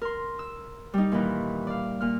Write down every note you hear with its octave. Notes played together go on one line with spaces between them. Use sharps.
A#4 C6
E6
G3 D#4
A#2 D#3 E3
D5 F5
A#2 F6